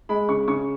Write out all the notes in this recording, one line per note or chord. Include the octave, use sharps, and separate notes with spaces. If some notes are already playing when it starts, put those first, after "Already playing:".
G#3 B5
C#3 C#6
C#3 C#6